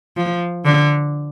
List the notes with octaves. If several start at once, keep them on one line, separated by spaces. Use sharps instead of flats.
F3
D3